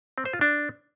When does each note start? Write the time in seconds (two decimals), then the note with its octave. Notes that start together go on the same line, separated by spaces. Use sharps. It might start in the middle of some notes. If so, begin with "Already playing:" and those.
0.18 C4
0.25 C5
0.33 F4
0.41 D4